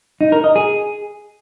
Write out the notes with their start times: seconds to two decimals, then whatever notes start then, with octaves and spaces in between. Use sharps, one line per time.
0.21 D#4
0.32 A#4
0.44 D#5
0.56 G#4